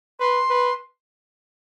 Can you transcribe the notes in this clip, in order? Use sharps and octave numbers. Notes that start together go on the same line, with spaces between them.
B4 C6
B4